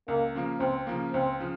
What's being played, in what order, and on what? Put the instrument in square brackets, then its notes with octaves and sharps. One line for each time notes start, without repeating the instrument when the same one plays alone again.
[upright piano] C#2 [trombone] A#3
[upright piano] C#3 F3 A#3
[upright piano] C#2 [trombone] C4
[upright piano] C#3 F3 A#3
[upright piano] C#2 [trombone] C4
[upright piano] C#3 F3